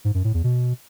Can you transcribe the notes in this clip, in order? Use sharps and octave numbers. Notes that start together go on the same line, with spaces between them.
G#2
F#2
A2
E2
B2